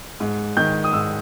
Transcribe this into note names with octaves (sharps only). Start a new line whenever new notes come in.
G#2
D#3 G6
D#6
G#2 E6